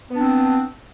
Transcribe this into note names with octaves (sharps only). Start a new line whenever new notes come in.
B3 C4 D4